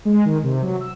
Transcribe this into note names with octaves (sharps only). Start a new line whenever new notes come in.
G#3
D#3
C3
F#3
E6